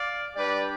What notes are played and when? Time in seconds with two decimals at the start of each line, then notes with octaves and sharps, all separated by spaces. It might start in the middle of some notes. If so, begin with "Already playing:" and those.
Already playing: D5 F5
0.36 G3 D4 G4 B4 D5